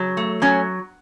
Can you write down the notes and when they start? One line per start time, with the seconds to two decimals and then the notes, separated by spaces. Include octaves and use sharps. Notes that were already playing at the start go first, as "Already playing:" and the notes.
Already playing: C#3 F#3
0.17 A3
0.42 F#3 C#4